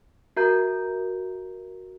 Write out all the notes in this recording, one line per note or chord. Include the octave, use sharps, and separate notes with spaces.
F#4 A#4 E5 A#5 G6